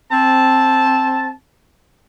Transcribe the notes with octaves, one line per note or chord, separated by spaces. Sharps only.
C4 A5